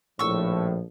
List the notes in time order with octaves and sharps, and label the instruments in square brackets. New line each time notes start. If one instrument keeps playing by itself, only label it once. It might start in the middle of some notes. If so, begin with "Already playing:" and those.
[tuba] A#1 [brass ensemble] A2 [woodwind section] F3 [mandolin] C#6 E6